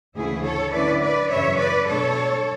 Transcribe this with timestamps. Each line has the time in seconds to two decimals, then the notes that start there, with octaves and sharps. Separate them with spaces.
0.16 D2 C#3 E3 A3 E4 G#4
0.45 A4 C#5
0.73 D3 A3 C#4 E4 B4 D5
1.02 B4 D5
1.30 F#2 C#3 E3 C#5 E5
1.58 B4 D5
1.88 B2 A3 D4 A4 C#5